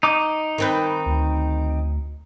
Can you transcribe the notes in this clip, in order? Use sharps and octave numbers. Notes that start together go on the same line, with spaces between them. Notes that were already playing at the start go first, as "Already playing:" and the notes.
D#4 D6
D#3 C4 B4
D2